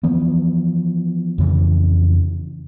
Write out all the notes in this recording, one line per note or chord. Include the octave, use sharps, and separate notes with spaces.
E3 F3 B3
F2 C#3 E3